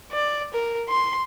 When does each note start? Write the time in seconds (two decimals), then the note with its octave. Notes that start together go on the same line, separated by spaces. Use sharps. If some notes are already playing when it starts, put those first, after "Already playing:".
0.12 D5
0.53 A#4
0.89 C6